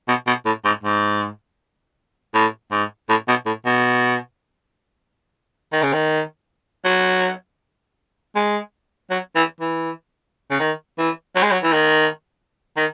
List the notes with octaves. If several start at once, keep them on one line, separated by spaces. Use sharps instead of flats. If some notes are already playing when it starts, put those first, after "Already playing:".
B2
B2
A2
G#2
G#2
A2
G#2
A2
B2
A2
B2
D#3
C#3
D#3
F#3
G#3
F#3
E3
E3
C#3
D#3
E3
F#3
G#3
F#3
E3
D#3
D#3